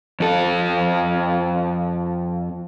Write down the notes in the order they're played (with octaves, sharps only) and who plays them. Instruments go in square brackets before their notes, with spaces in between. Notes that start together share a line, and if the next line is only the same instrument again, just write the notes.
[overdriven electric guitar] F2 A4